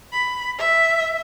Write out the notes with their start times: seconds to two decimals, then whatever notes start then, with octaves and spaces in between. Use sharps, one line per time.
0.12 B5
0.58 E5